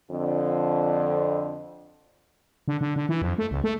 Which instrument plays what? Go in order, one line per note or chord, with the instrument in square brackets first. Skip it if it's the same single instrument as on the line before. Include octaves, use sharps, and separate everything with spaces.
[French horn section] F2 D3
[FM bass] D3
D3
D3
E3
F2
A3
C#2
A3